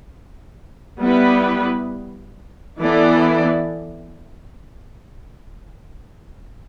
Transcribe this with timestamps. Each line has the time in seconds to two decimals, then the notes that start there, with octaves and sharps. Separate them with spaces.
0.99 G3 B3 E4 B4
2.80 E3 B3 E4 A4 D5